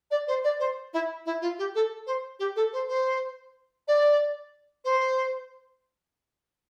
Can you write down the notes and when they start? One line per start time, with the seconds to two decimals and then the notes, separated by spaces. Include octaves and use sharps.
0.11 D5
0.27 C5
0.44 D5
0.59 C5
0.93 E4
1.25 E4
1.41 F4
1.58 G4
1.75 A4
2.06 C5
2.39 G4
2.56 A4
2.73 C5
2.88 C5
3.87 D5
4.84 C5